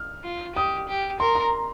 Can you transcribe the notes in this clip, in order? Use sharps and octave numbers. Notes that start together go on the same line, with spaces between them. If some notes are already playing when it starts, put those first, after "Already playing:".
Already playing: F6
F4
G4 D#6
G4
A#4 C6
A#5